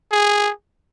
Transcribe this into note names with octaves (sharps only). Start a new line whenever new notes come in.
G#4